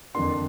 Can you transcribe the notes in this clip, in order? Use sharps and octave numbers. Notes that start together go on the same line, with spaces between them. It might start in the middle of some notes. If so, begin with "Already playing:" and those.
F2 D3 A#3 D4 C6